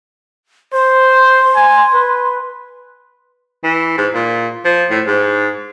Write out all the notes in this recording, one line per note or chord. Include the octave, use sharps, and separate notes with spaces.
C5 C6
G#5
B4
E3
G#2
A#2
F3
A2
G#2